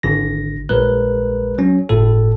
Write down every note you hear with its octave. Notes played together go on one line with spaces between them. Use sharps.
G#1 D3 A#6
A#1 G#3 A#4 B4 F#6
F#3 C#4
G1 A2 A4